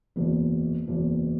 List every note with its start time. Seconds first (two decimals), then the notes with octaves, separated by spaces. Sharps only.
0.16 F#1 E2 B2
0.87 F#1 E2 B2